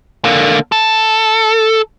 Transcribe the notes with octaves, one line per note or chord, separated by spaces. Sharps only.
D3 A#3
A4